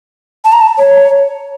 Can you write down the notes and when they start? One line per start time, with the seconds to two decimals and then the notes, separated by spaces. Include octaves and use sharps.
0.45 A5
0.53 A#5
0.61 A5
0.78 C#5